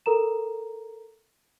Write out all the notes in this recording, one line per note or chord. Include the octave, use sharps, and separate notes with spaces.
A4 A#4 A#5 E7